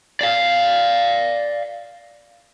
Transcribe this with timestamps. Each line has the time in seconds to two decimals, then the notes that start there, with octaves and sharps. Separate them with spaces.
0.21 D5 F5